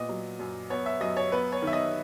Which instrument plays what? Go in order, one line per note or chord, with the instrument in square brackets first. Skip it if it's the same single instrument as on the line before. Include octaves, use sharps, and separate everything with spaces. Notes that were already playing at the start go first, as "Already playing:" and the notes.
Already playing: [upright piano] A#2 B3 D#5
F#3
F#2
B3 C#5
E5
F#2 D#5
C#5
B3 B4
C#5
D#3 E5
D#5